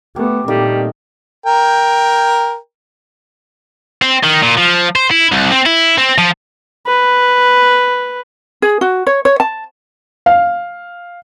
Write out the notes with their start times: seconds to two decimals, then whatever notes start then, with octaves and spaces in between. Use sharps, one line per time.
0.16 A3 B3 G4
0.48 A#2 D#3 G3 A3 A#3 C4
1.46 A#4 G5
4.02 C4
4.23 D#3
4.43 A#2
4.57 F3
4.95 C5
5.11 E4
5.32 C2
5.51 C4
5.66 E4
5.98 C4
6.18 F3
6.87 B4
8.62 G#4
8.81 F#4
9.07 C#5
9.25 C#5
9.40 A5
10.26 F5